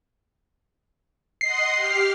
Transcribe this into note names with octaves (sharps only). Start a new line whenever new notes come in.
D#5 F#5 C6 C7
G4 F6